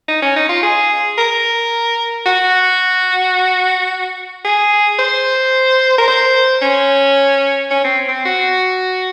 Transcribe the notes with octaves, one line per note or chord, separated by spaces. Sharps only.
D#4
C#4
D#4
F4
G#4
A#4
F#4
G#4
C5
A#4
C5
C#4
C#4
C4
C4
F#4